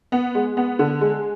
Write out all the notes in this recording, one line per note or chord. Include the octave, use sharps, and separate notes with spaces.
B3
G#3
B3
D3
G#3